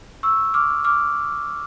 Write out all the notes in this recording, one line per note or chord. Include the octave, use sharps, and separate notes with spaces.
C#6 E6
D6 F6
D6 F6